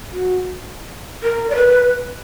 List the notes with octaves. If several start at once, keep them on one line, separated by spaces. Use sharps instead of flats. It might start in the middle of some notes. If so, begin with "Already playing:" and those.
F#4
A#4
D5
B4